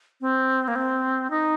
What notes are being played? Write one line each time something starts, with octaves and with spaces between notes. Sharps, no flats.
C4
A#3
C4
D#4